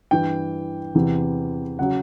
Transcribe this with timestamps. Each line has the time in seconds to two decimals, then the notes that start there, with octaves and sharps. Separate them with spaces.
0.11 G2 E3 G5
0.95 E2 C3 E3
1.79 C#3 F#3 F#5